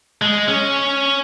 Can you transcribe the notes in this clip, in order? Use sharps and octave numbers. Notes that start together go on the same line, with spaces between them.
G#3
C#4